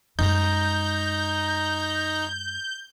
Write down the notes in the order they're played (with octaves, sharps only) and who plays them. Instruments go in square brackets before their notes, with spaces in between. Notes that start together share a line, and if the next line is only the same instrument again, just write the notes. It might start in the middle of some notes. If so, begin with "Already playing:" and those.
[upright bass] F#2 G#3 [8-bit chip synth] D#4 A#5 [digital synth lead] G6